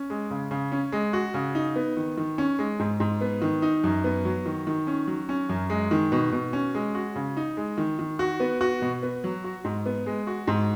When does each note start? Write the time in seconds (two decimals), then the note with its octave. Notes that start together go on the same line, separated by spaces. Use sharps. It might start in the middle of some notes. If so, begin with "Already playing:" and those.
Already playing: C#4
0.10 G#3
0.30 C#3
0.51 C#3
0.72 C#4
0.92 G#3
1.13 F#4
1.34 C#3
1.55 D#4
1.76 B3
1.97 D#3
2.18 D#3
2.38 C#4
2.59 G#3
2.79 G#2
3.00 G#2
3.21 B3
3.42 D#3
3.62 D#4
3.84 F#2
4.04 B3
4.25 F#3
4.46 D#3
4.67 D#3
4.87 C#4
5.07 F#3
5.29 C#4
5.49 F#2
5.70 G#3
5.91 D#3
6.12 B2
6.32 B2
6.53 C#4
6.75 G#3
6.95 F#4
7.16 C#3
7.37 D#4
7.57 G#3
7.78 D#3
7.99 D#3
8.19 F#4
8.40 B3
8.61 F#4
8.82 B2
9.02 B3
9.24 F#3
9.44 F#4
9.65 G#2
9.86 B3
10.06 G#3
10.27 F#4
10.47 G#2